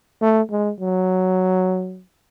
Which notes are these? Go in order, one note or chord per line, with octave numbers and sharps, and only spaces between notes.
A3
G#3
F#3